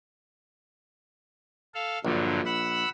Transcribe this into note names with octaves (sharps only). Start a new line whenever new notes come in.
A4 F5
A#1 G2 D3 F#3
F#5 B5 E6